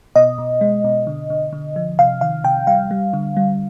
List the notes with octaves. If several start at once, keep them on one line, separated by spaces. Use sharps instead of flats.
B2 D#5
B2
G#3
B2
D3
D3
D3
F3
C3 F5
D#3 F5
C3 G5
G3 F5
G3
D3
G3